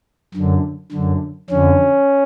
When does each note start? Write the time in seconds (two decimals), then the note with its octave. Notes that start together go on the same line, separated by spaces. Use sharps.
0.34 F#2 D3
0.92 F#2 D3
1.50 F2 D3 C#4